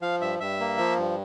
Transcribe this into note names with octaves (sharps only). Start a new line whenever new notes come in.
F3 F5
G2 E5
G2 E5
A#3
F3
G2